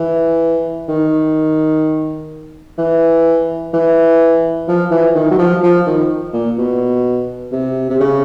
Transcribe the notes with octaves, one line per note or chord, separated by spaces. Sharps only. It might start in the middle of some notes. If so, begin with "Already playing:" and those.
Already playing: E3
D#3
E3
E3
F3
E3
D#3
F#3
F3
F3
D#3
A#2
B2
C3
C3
C#3